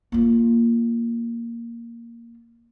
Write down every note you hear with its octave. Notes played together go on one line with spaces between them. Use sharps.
A#3 F4